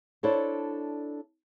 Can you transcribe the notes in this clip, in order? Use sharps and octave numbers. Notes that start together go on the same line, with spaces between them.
D4 E4 A4 C5 C#5